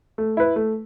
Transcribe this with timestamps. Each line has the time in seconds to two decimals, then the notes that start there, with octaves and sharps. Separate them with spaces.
0.18 A3
0.37 E4 B4
0.56 A3